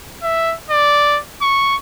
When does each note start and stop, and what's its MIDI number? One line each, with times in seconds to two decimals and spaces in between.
0.23 0.55 76
0.71 1.20 74
1.42 1.76 85